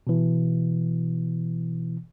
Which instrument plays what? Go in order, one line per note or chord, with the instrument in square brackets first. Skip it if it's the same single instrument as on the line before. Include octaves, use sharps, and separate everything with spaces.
[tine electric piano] B2 E3